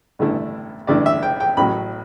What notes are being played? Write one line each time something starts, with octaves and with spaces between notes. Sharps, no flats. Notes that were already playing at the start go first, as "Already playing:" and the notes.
A1 G2 D3 A3 E4
A1 G2 D3 A3 E4 D5
E5
G5
G5
A1 A2 F#3 B5